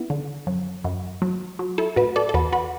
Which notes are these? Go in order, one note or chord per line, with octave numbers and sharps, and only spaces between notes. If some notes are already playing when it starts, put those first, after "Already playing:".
Already playing: B3 E4
D3
F#2
F#2
F#3
F#3
E4 A4
A2 F#4 B4
A4 D5
A4
E2 F#4 B4
F#4 B4